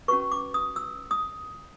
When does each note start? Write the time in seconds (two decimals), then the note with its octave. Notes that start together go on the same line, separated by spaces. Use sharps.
0.08 C#4 F#4 B4 C#6
0.32 D6
0.54 D#6
0.76 E6
1.11 D#6